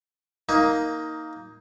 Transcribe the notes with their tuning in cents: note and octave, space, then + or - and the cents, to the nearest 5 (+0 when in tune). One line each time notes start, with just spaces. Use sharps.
A#3 +0 D#4 +15